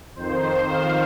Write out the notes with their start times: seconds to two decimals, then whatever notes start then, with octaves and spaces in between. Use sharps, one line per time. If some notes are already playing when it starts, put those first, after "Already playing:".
0.15 F2 D#3 C5
0.68 F5